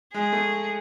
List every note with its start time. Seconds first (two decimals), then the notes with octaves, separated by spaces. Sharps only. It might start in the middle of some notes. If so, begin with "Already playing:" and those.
0.14 G#3 G#4
0.33 A3